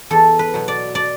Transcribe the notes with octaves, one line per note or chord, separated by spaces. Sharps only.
E2 A4
B4
B2 F#3
D5
D5